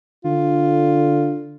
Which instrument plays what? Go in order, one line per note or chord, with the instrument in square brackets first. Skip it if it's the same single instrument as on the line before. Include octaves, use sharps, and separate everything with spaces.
[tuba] D3 [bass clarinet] F4